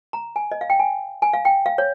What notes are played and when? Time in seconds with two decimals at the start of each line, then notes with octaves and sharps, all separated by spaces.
0.13 A#5
0.36 G#5
0.52 D#5
0.61 F5
0.70 G5
0.80 G#5
1.22 G#5
1.33 F5
1.45 G5
1.66 F5
1.78 C#5